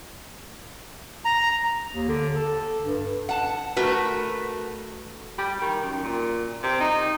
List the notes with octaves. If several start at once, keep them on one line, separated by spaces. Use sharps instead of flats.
A#5
D#2
D3
A4
G2
F#5 A5
A3 F#4 A#4 B4
G3
D#3
F#2
A#2
C3
D#4